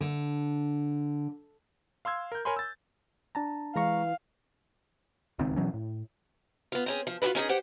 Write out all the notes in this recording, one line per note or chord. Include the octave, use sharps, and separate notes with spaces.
D3
F5 C6 E6 G#6
A#4 G6
A#4 C#5 G#5 B5 C6
E6 A6
D4 A5 A#5
E3 G#3 F5 A#5 C#6
D1 C#2 D#3 C4
B2 E3 F#3 C#4
A2
B3 F4
C4 C#4 G#4
F3
F4 F#4 G#4 A#4 B4
C#4 D#4 G4 G#4
G4 C5 F#5 G5